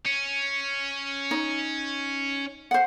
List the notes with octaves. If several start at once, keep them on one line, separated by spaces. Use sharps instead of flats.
C#4
D#4 C#5
C5 F#5